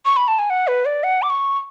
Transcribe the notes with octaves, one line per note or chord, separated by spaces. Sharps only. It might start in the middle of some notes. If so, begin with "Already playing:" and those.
C#6
B5
A5
G#5
F#5
B4
D5
F#5
D6
C#6